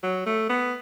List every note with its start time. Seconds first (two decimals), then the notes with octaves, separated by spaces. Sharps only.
0.03 F#3
0.26 A3
0.49 B3